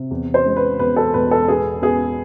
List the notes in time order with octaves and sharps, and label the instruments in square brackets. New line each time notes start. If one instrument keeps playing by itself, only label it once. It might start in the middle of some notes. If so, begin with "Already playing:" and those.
Already playing: [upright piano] C3
E2
C5
G#3
B4
E2 B4
A4
E1 B4
A4
B3 G#4
B3 G#4